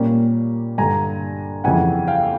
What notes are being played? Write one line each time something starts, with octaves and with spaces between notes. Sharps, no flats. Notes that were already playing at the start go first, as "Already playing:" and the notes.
Already playing: A#2 G3 A#3 C#4
G2 D3 G3 G#5 A#5
F2 C#3 E3 G3 F#5 G#5
F5 G5